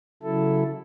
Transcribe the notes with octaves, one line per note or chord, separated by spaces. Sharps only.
C#3 F#3 E4 A4